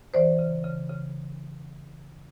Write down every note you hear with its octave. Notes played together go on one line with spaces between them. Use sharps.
E3 C5 D5
C#3
C#3
C#3